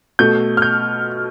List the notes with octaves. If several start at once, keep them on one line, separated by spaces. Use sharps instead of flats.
B2 A3 G6
F6
G6